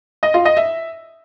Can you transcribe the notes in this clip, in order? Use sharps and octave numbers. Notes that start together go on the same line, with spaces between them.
D#5
F4
D#5
E5